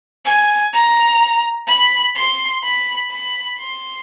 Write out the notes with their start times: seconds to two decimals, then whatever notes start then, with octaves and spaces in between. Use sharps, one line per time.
0.25 G#5
0.73 A#5
1.68 B5
2.15 C6
2.63 B5
3.10 B5
3.58 C6